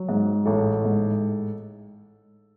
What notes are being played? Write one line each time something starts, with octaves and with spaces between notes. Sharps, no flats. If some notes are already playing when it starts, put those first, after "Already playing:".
Already playing: F#3
G#2
A1 A4
G#2